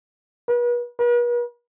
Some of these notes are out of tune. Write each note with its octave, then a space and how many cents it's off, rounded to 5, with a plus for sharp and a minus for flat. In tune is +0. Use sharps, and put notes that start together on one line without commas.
B4 -40
B4 -45